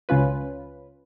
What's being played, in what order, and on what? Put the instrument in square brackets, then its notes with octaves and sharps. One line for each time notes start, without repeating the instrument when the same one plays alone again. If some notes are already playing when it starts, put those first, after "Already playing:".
[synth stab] C#2 C#4 F4 B4